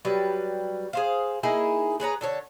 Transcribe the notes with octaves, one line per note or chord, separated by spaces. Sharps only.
F#3 G3 B4
G#4 C5 F5
A#3 D#4 E4 G#4
G#4 B4 C#5 A#5
D3 A4 C#5